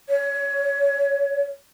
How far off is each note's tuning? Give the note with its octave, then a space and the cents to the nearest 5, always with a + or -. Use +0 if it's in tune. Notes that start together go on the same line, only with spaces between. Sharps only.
C#5 +20